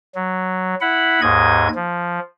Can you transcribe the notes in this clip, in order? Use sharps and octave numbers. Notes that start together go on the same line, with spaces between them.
F#3
E4 F#5 B5
D#2 G#2 D#5 G#6
F3